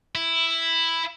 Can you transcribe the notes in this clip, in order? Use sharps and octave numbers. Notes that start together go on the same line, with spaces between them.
E4